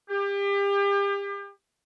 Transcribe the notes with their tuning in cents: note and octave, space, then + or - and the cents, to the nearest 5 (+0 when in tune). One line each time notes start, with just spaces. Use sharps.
G4 +35